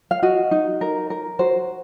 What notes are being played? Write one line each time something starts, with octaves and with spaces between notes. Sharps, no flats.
F5
F#4 D#5
D#4
A#4
A#4
F#4 C5